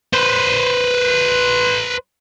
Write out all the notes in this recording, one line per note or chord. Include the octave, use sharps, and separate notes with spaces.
B4 C5